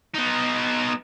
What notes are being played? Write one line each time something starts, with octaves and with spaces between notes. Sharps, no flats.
B3 D#4